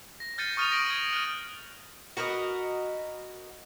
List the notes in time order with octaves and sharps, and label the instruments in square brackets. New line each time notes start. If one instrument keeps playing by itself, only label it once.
[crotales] A#6
F6 G6 A6 C7 C#7 D#7
C#6 D#6 F6 A6 D#7 F7
A#6 D7 F#7
G#6
F6 F#6
[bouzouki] F#4 A#4 B4 D#5